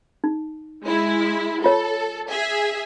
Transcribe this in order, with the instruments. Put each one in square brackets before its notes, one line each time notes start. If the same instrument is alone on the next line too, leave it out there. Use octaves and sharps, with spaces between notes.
[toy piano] D#4
[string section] G#3 E4
[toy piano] F4 C#5 [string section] A4
[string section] G#4 E5